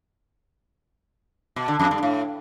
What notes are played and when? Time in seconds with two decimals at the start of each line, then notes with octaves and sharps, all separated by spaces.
1.56 B2
1.68 D3
1.79 F2
1.91 G2
2.03 A2